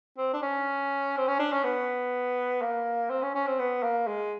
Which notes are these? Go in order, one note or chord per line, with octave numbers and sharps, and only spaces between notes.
C4
D4
C#4
C4
C#4
D4
C#4
B3
A#3
C4
C#4
C#4
C4
B3
A#3
G#3